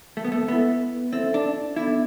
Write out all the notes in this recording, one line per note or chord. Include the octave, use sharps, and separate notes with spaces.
A3
B3
A3
B3 E4 A4 E5
C4 E4 A4 E5
D4
B3 D4 E4 A4 E5